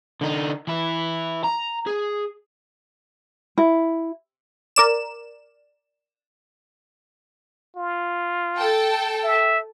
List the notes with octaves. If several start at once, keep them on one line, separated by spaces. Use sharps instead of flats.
D3 D#4
E3 E4
A#5
G#4
E4
A#4 D5 E7
F4
A4 G5 A5
E5